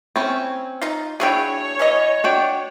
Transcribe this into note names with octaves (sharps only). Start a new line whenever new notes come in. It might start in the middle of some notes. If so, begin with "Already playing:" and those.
C4 C#4 E4
D#4 F4
F#3 D4 E4 G#4 C#5 F5 G5
E3 F#3 D#5
D4 F#4 G5